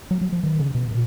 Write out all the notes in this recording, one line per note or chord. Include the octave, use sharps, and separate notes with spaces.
F#3
F#3
F3
D#3
C#3
B2
A#2